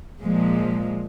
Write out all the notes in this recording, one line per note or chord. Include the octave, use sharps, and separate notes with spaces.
A#2 F3 G#3